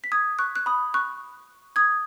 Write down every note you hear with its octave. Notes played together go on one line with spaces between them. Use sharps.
B6
D#6 G#6
C#6 F#6
F#6
B5 D#6
C#6 F#6
D#6 G#6